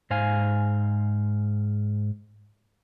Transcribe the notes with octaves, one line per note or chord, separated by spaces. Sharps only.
G#2 C5 F5 G#5